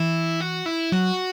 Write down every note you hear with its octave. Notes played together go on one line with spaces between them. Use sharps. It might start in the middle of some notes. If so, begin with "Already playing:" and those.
Already playing: E3 E4
F#4
E4
F#3 F#4